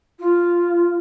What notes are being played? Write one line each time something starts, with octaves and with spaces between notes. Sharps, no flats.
F4